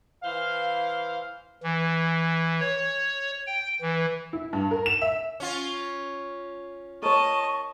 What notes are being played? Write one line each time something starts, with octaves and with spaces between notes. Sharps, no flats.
E3 C5 F5
E3
C#5
G5
E3
E4
G2
A#4
E7
E5
C#4 F4
A#4 C#5 D#5 A5 C#6